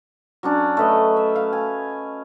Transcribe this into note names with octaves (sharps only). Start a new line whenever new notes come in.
F#3 C#4 D4
A3 B4 D#5
E5
F5
G#5